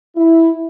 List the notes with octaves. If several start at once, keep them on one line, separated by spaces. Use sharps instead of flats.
E4